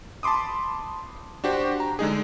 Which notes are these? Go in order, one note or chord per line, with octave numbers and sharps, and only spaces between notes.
A5 B5 C6 D6 D#6
D4 F#4 G4 C5
A#5
D3 G#3 D#4 G#4